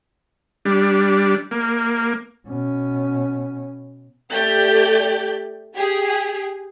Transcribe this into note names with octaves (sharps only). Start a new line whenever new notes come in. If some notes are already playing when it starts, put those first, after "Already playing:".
G3 D4
A#3
B2 C#4
A3 G4 D5 G6
G4 G#4